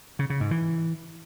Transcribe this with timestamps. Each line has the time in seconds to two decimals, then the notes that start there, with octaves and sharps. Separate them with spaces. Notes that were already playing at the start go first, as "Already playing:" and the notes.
0.19 C#3
0.30 C#3
0.40 G#2
0.51 E3